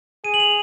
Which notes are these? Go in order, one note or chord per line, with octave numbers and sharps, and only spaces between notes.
G#4 D#7
F#7
F7